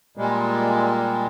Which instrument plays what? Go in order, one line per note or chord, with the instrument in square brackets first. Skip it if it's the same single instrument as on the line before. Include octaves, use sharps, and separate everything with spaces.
[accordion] A#2 G3 G#3